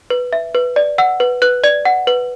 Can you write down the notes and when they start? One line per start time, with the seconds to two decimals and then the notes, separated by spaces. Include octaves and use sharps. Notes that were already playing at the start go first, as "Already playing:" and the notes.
0.10 B4
0.33 E5
0.55 B4
0.76 D5
0.98 F#5 E6
1.20 B4
1.42 B4 F#6
1.64 D5 G#6
1.85 F#5
2.07 B4